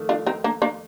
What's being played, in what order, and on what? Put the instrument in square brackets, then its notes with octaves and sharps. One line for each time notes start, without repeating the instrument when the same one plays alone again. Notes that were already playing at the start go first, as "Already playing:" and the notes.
Already playing: [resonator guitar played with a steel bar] F2 D#3 A3
[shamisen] D4 F4
C4 D#4
A#3 D4
A#3 D4